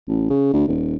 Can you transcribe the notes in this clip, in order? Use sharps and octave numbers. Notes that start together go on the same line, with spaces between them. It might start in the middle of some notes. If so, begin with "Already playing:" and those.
A1
C#3
D2
D#1